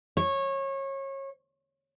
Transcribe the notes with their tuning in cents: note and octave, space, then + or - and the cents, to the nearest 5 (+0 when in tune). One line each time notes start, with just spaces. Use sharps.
C#5 -25